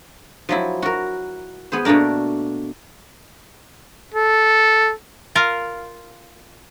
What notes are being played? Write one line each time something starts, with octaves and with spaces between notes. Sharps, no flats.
F3 F#3 E4
F#4 A#4
B3 G#4 C5
B2 A3 A#3 D4 A#4
A4
F4 A#4 F5